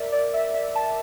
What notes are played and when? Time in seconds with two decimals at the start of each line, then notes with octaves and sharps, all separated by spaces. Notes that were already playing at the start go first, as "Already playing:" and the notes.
Already playing: A#4 D5 E5
0.12 D5
0.34 E5
0.55 E5
0.75 A5